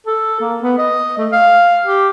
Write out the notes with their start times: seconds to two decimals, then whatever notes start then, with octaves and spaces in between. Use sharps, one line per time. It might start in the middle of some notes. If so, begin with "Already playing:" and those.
0.06 A4
0.40 A#3
0.62 B3
0.78 D#5
1.18 A3
1.32 F5
1.86 G4